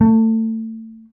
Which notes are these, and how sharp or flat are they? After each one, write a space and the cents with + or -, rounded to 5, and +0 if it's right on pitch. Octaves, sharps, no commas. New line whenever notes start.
A3 +25